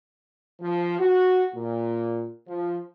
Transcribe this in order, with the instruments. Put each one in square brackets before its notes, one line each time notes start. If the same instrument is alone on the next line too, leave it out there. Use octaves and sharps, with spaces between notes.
[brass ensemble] F3
F#4
A#2
F3